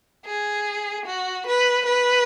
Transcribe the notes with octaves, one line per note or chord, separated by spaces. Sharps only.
G#4
F#4
B4
B4